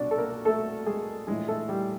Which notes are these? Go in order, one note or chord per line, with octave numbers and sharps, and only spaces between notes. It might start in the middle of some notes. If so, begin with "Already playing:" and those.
Already playing: C2 B2 G3 D4 F#4 D5
A4
A#3 A#4
A3 A4
G#3 G#4
A#1 A2 E3 G#3 G#4
A3 A4
G3 G4